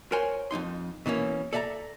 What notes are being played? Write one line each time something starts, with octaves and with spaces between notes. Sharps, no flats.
A#4 C5 C#5 F#5 G#5 C6
F2 G#2 D#4 C6
B2 E3 A#3 C#4
A4 D5 E5 A5 A#5